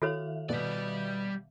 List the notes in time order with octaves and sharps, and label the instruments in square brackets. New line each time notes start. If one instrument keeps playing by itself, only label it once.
[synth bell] D#3 E5 F5 [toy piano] F#4 A4 C#5
[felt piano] B2 B3 [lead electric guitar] G3 D5